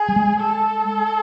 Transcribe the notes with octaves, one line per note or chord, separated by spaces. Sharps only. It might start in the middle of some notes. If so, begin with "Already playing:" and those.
Already playing: G#4
G3
G#3
A4